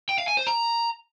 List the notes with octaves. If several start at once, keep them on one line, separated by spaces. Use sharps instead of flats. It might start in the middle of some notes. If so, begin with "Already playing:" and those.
G5
F5
G#5
C5
A#5